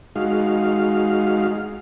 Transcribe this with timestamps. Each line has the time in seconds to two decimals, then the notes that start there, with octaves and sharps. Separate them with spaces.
0.16 G#3 D#4 F#4 F5